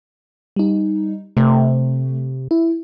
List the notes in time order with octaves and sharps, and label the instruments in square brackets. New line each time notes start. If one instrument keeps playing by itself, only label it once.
[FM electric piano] G3 D#4
[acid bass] C3 [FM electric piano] A3
[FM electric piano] E4